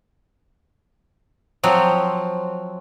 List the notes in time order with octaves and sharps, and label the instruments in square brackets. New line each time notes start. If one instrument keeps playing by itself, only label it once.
[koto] F3 F#3 C4